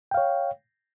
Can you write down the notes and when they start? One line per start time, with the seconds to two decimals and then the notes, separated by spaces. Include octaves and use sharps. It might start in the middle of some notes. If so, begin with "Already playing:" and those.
0.11 G5
0.14 F5
0.17 C#5